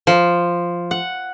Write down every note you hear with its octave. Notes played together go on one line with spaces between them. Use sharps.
F3
F#5